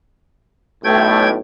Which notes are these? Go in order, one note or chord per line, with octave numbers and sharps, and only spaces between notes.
B1 A2 A3 G5 G#6